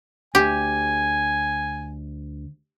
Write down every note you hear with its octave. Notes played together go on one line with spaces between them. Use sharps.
D2 G4 G#5